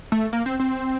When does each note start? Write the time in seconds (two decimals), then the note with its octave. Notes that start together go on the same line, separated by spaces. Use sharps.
0.12 A3
0.33 A#3
0.46 C4
0.59 C4